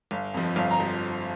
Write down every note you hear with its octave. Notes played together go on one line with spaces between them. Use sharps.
G1 F5
F2 F3
G1 F5
A#5
F3